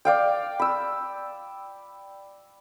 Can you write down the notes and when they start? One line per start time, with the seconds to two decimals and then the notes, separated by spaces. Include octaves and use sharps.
0.05 D5 F5 G5
0.59 B5 E6